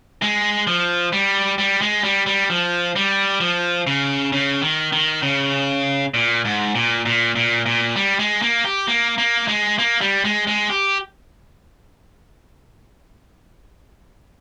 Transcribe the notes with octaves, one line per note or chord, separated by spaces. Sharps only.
G#3
F3
G3
G3
G#3
G3
G3
F3
G3
F3
C#3
C#3
D#3
D#3
C#3
A#2
G#2
A#2
A#2
A#2
A#2
G3
G#3
A#3
G4
A#3
A#3
G#3
A#3
G3
G#3
G#3
G4